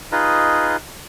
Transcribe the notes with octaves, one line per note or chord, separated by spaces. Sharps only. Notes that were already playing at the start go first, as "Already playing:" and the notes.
D#4 F4 G#4 B4 D#5